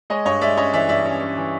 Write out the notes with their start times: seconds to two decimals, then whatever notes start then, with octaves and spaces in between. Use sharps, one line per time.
0.10 G#3 C#5 D#5
0.25 G2 C#5 D#5
0.41 G#3 D5 E5
0.57 C#4 C#5 D#5
0.73 E3 D5 E5
0.89 G2 D5 E5
1.05 C#4
1.21 C#4
1.37 E3